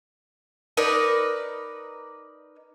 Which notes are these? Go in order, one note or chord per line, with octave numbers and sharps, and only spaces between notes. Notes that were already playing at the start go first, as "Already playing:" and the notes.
D#4 A#4 B4 D5